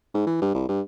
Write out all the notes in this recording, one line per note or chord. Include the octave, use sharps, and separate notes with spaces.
G#2
E3
G2
C2
G2